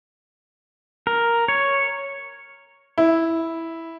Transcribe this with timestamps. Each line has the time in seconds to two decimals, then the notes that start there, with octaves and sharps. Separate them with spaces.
1.07 A#4
1.48 C#5
2.98 E4